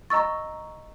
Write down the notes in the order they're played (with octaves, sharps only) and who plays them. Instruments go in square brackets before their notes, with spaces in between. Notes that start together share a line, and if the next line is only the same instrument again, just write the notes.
[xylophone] D#5 E6 A6 [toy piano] A#5 C#6